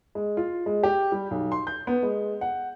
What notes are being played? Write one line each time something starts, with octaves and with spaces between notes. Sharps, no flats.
G#3
F4
G#3
G4
G3
B1
C6
G6
B3
G#3
F#5